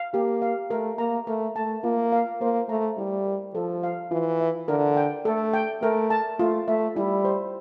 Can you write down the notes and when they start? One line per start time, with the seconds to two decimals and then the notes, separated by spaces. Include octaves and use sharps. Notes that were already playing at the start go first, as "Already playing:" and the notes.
Already playing: F5
0.14 A#3 G4
0.42 F5
0.70 A3 A#4
0.98 A#3 A#5
1.27 A3 A#4
1.56 A3 A5
1.84 A#3 F4
2.12 F5
2.41 A#3 C5
2.69 A3 A#5
2.97 G3 E4
3.26 A#4
3.54 F3 A4
3.83 F5
4.11 E3 F4
4.40 E5
4.68 D3 A#4
4.97 G5
5.25 A3 A4
5.54 G5
5.82 A3 A#4
6.10 A5
6.39 A3 F4
6.68 A3 E5
6.96 G3 E4
7.25 C5